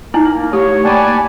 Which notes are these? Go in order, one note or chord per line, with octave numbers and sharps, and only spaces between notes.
A#3 D#4 E4
A3 G4 C#5
A#3 D5 F#5 G#5 A5 B5